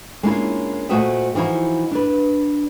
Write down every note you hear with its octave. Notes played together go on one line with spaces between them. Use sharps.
G#3 A#3 C#4 D4 E4 F4
A#2 A3 F#4 C5 D#5 E5
E3 F3 D#4 E4 F#4
D4 B4